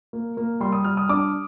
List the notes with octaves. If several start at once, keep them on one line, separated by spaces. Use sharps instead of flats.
A#3
A#3
G3 C6
D#6
G3 F6
D#6
D4 D6